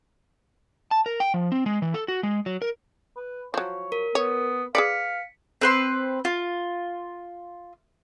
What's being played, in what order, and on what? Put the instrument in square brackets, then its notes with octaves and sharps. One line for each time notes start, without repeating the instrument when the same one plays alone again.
[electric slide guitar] A5
A#4
G5
F3
C4
G#3
E3
A4
F#4
G#3
F#3
A#4
[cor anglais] B4
[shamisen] F3 F#3 [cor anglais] C#5
[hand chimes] A#4
[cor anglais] B3 [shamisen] C#5
[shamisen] G#4 B4 D5 [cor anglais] F5 [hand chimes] B6 C#7
[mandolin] C4 B4 C6
F4